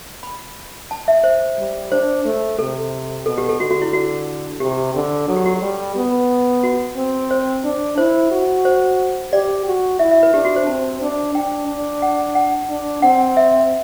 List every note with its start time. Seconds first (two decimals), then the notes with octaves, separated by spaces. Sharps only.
0.23 B5
0.91 A5
1.08 E5
1.24 C5
1.58 G3
1.92 D4 C5
2.25 A3
2.59 C3 A4
3.26 B2 A4
3.38 G4
3.49 A4
3.60 D3 F#4
3.71 F#4
3.82 E4
3.93 F#4
4.60 C3 G4
4.95 D3
5.28 F#3 A4
5.37 G4
5.45 F#4
5.56 G4
5.62 G3
5.96 B3
6.63 F#4
6.97 C4
7.31 C5
7.64 D4
7.98 E4 C5
8.31 F#4
8.65 C5
9.33 G4 D5
9.66 F#4
9.99 E4 E5
10.11 E5
10.23 B4
10.34 D4 G4
10.45 F#4
10.56 C5
10.67 C4 A5
11.01 D4
11.35 D4 G5
11.68 D4
12.02 F#5
12.35 F#5
12.69 D4
13.02 C4 F#5
13.37 E5